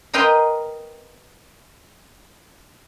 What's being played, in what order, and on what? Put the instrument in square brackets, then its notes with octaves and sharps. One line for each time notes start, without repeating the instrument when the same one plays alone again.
[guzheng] A#4 B4 D#5 G5 A#5 C6